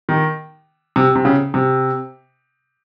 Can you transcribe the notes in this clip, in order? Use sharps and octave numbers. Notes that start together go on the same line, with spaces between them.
D#3
C3
C3
C#3
C3